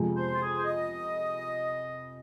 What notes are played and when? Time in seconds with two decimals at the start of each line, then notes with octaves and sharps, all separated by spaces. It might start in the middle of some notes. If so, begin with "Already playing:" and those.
Already playing: F2 C3 F3 G#3
0.16 C5
0.34 F4
0.40 G#4
0.54 C5
0.65 D#5